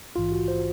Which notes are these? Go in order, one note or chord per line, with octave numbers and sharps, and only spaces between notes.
A#1 G#2 E3 F4
F#4
C5